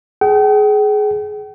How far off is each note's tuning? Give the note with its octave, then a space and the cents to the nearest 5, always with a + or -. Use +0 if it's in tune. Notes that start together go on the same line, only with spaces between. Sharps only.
G#4 +20 G5 -40